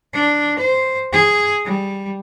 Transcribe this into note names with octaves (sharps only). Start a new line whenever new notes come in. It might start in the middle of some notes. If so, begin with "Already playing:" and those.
D4
C5
G#4
G3